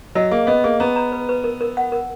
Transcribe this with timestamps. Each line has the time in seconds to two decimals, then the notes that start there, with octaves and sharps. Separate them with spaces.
0.15 F#3 D#5
0.31 A#3 G#4
0.47 B3 D#5
0.64 A#3 G#4
0.80 B3 A#5
0.96 A#5
1.12 B4
1.29 B4
1.44 A#4
1.61 A#4
1.77 F#5
1.92 A#4